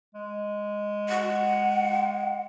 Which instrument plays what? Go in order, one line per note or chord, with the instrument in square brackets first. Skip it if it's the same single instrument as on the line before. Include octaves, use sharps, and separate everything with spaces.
[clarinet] G#3
[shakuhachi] F#5